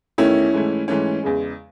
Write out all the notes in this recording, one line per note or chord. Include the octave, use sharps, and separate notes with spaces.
E2 D#3 A3 C#4 E4
G#2 E3 A3
G#2 E3 A3 C#4
E2 C#3 G#3